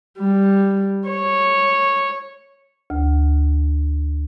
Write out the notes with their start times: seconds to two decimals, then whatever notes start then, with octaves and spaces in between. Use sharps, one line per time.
0.18 G3
1.08 C#5
2.90 D2